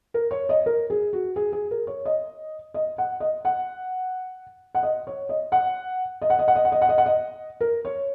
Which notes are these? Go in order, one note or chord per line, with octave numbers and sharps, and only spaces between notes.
A#4
C#5
D#5
A#4
G#4
F#4
G#4
G#4
A#4
C#5
D#5
D#5
F#5
D#5
F#5
F#5
D#5
C#5
D#5
F#5
D#5
F#5
D#5
F#5
D#5
F#5
D#5
F#5
D#5
F#5
D#5
A#4
C#5